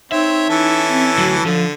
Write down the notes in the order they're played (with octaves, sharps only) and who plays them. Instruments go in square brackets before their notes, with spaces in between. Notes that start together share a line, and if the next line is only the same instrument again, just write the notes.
[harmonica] C4 C#5 [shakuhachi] D#4 [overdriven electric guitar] E5
[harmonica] E3 C#4 A4
[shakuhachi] C4
[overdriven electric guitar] D2 F#3 [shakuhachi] F#4
[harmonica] D3 [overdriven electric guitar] F3 [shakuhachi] A4